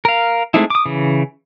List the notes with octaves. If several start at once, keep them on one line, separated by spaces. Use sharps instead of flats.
A#4 F5
G#3 A3 C4 D#4 E4
D6 D#6
C#3 E3